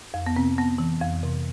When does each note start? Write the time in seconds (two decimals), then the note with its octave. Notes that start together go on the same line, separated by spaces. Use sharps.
0.14 F2
0.26 B3
0.36 C3 C4
0.58 B3
0.78 E3
1.01 F2
1.23 C3